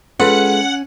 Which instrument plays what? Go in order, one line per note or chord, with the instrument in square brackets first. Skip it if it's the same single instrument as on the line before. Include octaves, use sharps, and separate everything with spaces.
[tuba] G#3 [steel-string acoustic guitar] C#4 [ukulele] F4 A4 B4 [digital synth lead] F#5